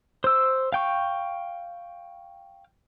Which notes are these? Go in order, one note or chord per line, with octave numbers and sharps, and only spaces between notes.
C5 E6
F5 G5 C#6